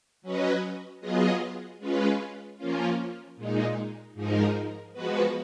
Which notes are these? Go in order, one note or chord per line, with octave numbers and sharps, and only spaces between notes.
F#3 C#4 F#4 B4 D#5
F#3 B3 F4 G#4 D#5
G#3 C#4 F4 B4
F3 A#3 C#4 F4
A#2 G#3 D#4
G#2 F3 G#3 D#4 A#4
F3 G#3 B3 F#4 B4